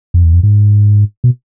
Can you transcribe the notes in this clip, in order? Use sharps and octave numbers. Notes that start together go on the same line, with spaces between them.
F2
E2
F2
G#2
B2